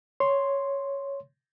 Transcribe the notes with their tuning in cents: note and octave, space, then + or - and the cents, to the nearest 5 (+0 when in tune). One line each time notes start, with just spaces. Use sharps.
C#5 +0 C6 +0